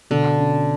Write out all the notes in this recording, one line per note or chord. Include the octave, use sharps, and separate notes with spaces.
B2 D3
C#4